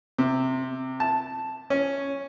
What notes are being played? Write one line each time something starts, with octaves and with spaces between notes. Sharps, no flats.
C3
A5
C#4